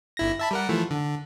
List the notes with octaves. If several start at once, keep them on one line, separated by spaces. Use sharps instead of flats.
G1 E4 A#6
E5 A5 B5
G3 A#4 F#5
E3 F3 A3
D3